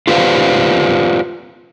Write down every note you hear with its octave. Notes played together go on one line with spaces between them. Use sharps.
F4 G4 B4 C5 D5 F5